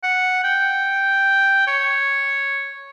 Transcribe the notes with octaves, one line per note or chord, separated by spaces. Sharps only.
F#5
G5
C#5